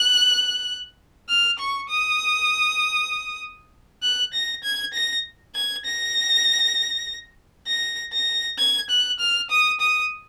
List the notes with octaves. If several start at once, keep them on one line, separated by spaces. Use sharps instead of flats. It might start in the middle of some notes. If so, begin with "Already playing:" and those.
Already playing: F#6
F6
C#6
D#6
F#6
A#6
G#6
A#6
G#6
A#6
A#6
A#6
G#6
F#6
F6
D#6
D#6